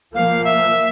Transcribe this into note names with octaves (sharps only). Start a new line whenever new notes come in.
A#2 F3 A#3 F5
E5